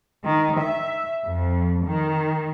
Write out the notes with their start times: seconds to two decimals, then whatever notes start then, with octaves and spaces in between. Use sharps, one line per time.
0.24 D#3
0.58 E5
1.26 F2
1.86 D#3